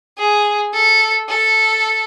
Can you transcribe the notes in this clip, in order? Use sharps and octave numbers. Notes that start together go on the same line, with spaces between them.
G#4
A4
A4